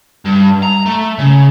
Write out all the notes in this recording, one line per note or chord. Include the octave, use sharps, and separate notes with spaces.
G2
A#5
A3
C#3